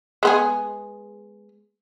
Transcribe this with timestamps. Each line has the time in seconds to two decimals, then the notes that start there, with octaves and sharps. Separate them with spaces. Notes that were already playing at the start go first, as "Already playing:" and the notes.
0.23 G#3 B3 G#4